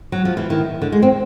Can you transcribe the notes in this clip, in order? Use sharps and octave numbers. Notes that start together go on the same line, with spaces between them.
F#3
F3
E3
D#3
D3
G#3
C4